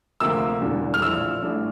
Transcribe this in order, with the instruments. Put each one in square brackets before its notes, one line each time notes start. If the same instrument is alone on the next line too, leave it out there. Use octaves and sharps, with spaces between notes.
[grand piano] D2 C3 F3 A#3 [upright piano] E6
[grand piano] E1 E2 D3 G3
[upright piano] F6
[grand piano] A#1 A2 F3 [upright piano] E6
[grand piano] A1 A2 G3 D4